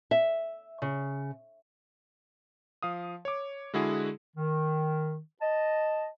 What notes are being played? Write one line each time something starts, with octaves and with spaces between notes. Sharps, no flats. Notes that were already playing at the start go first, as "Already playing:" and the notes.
E5
C#3
F3 F5 D#6
C#5 D6
D3 G#3 E4 F#4 G#4
D#3
D#5 A5